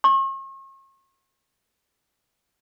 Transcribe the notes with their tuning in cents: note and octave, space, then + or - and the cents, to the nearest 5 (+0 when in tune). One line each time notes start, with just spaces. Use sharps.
C#6 -45